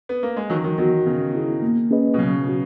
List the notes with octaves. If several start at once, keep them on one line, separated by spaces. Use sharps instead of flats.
B3
A#3
G#3
D#3 E3 F#3
D#3 F#3
D#3 F#3 B3 F#4
C#3 B3
E4 G#4
A#3
C#4 G#4 B4 D#5
B2
C#3 F#3
C#4 F#4